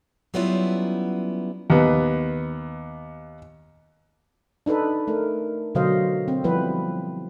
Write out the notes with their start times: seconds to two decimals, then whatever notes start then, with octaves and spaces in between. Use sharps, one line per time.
0.34 F#3 G3 B3 C#4 E4 F4
1.70 D#2 B3
4.66 D4 D#4 A4 B4
5.08 A3 A#4
5.75 B2 D3 F#3 C5 D#5 F5
6.28 C4
6.44 F3 G3 B3 E4 B4